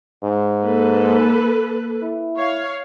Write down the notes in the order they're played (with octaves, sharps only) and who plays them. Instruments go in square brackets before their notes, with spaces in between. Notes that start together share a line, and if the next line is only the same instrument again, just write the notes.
[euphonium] G#2
[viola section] A#3 A4 B4
[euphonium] E4
[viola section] C#5 F5